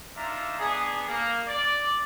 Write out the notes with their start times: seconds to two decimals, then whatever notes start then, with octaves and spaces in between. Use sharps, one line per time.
0.15 D4 D#4 F4 E5 A#5
0.59 B3 D4 G#4
1.08 A#3
1.47 D5